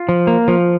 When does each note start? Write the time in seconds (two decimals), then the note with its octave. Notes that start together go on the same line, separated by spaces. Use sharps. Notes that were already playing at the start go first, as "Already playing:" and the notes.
Already playing: F4
0.09 F3
0.27 A#3
0.48 F3